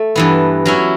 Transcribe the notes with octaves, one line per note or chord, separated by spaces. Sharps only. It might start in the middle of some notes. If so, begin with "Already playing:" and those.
Already playing: A3
G2 E3 B3
F#3 C#4 E4